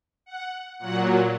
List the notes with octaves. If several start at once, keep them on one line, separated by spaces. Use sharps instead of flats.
F#5
A#2 F#3 F#5